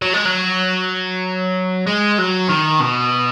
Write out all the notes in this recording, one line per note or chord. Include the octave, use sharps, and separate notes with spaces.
F#3
G#3
F#3
G#3
F#3
D#3
B2